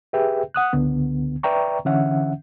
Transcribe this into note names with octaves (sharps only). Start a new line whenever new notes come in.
G4 G#4 B4 E5 G5
F#5 D#6 F#6
C#2 D3 B3
B4 D5 E5 G5 A#5 C#6
D3 E3 C#4 E5 F#5